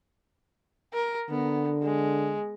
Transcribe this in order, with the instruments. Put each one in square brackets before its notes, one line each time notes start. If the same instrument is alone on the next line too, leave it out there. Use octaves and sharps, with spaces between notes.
[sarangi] A#4
[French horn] D3 [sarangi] B3
[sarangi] G#3